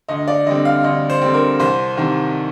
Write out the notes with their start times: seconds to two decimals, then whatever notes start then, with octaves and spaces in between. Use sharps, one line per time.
0.08 D2 D#5
0.28 D5
0.46 D3 G3 C4 D#5
0.65 F5
0.84 D2 D#5
1.10 C5
1.22 D3 G3 C4
1.34 A#4
1.60 C2 C5
1.97 C3 D#3